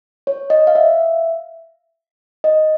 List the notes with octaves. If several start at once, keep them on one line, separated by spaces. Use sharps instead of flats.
C#5
D#5
F5
E5
D#5